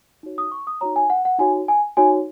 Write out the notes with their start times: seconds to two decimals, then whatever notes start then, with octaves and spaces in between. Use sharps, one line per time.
0.23 D#4 F#4 C#5
0.38 D#6
0.52 C#6
0.67 D#6
0.81 D#4 F#4 C#5 A#5
0.96 G#5
1.10 F#5
1.25 F#5
1.39 D#4 F#4 C#5 G#5
1.68 G#5
1.97 D#4 F#4 C#5 G#5